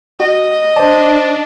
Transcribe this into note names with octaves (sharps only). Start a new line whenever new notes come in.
F#4 D#5
D4 C5 D5 A5